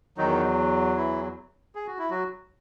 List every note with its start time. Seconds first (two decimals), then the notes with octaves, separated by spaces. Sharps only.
0.18 E2 D#3 F#3 D#4
0.97 E3 E4
1.75 G#4
1.87 F#4
1.99 E4
2.10 F#3 F#4